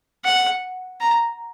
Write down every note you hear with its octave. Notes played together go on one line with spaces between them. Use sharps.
F#5
A#5